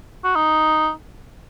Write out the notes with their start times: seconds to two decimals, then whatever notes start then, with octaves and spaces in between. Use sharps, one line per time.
0.24 F#4
0.36 D#4